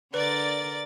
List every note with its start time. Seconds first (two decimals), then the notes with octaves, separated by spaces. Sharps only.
0.14 D3 A#4 B4 D5 A6